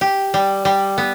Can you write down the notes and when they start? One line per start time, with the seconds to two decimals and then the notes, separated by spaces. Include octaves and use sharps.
0.01 G4
0.34 G3
0.65 G3
0.98 B3